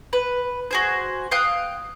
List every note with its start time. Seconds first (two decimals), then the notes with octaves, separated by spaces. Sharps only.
0.13 B4
0.71 F#4 G#4 C5
1.31 F5 G5 D#6 F#6